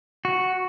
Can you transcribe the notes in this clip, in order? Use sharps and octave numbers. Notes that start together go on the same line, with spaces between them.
F#4